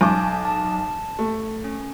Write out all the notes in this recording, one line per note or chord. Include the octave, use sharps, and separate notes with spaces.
B1 G#5 A5 D6 G6
A5
A3
C#4